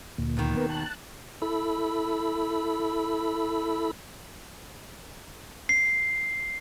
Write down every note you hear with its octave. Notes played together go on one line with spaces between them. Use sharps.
D2 A#2
D#2 B2 D#3
B3 A#4
A5 F#6
E4 A4 B5
C7